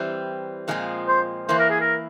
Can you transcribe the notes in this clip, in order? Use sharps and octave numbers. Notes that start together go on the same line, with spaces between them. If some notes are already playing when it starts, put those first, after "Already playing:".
Already playing: E3 G3 C4
A#2 F3 G#3 C4
C5
E3 A#3 E4 C5
A#4
G#4
A#4